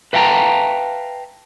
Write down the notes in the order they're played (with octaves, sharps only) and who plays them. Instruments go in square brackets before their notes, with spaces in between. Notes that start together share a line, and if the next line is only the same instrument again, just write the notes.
[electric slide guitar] B4 E5 F5 G5 A5 A#5